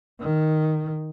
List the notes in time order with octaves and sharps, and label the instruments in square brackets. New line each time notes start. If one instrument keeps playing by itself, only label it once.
[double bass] D#3